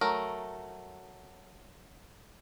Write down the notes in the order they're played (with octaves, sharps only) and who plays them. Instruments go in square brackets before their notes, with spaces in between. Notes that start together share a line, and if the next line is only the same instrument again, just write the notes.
[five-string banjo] F#3 A3 A#4